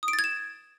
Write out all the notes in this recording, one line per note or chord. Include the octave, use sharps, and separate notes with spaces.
D#6
D7
A6
G#6
E7